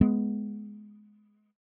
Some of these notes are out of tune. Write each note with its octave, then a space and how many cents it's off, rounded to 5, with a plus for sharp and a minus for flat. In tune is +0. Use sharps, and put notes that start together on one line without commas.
G#3 +15 B3 +0